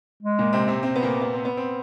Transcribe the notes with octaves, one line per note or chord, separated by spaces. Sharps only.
G#3
A#2 A#3
C3 C4
C3 C4
C3 C4
B3
A#2 A#3
B3
C4
B3
C4